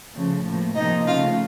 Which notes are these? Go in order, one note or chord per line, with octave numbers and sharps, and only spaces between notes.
C#3 F3 A3
A2 F3 A#3
C3 F3 A#3 D#4 D#5
C#3 A3 F4 F5